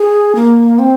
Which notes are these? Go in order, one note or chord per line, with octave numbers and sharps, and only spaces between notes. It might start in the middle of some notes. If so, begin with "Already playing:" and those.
Already playing: G#4
A#3
C4